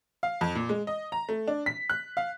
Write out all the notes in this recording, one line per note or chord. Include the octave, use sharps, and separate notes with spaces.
F5
F2
A#2
G#3
D#5
A#5
A3
D4
B6
F#6
F5